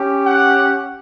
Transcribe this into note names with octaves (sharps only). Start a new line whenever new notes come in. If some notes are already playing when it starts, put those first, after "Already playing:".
Already playing: C#4 G4
F#5